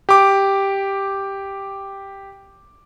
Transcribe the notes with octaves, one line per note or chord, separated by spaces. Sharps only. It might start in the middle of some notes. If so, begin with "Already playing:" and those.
G4 D6